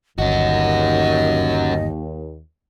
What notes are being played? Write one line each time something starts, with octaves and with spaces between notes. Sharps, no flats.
G1 D#2 C#4 F#4 D#5